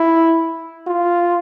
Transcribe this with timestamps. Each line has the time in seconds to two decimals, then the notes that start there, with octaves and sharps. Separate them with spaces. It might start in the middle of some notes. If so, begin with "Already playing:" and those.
Already playing: E4
0.87 F4